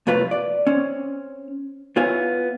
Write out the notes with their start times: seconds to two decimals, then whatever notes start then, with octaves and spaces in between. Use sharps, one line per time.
0.07 C2 F2 A2 F4 B4
0.31 D5
0.67 C4 C#4
1.96 B3 E4 F4 C#5 G#5